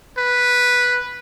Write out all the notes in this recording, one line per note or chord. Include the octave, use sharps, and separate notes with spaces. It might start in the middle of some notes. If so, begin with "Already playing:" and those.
B4